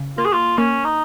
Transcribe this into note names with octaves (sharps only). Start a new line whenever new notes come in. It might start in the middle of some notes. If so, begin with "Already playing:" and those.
Already playing: C#3
A#3 F4
G#4
F4
A#3 C#4
D#4